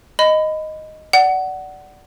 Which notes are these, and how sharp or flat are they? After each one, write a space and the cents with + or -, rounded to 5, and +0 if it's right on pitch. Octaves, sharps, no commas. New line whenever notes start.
D#5 +0 B5 +25
D5 +0 F#5 +15